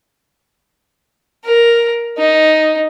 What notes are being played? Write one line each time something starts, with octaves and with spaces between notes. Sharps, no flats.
A#4
D#4